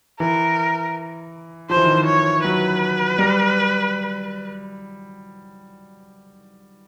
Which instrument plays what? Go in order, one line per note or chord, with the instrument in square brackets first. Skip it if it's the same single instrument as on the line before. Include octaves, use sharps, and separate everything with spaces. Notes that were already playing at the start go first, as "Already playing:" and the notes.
[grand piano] E3 [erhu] A#4
[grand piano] F3 [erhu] C5
[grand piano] E3
D#3
E3
[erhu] C#5
[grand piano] F#3 [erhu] B4
[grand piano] G3